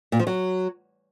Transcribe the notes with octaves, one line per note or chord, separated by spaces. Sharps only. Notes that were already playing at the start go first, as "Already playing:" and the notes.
A#2
F3
F#3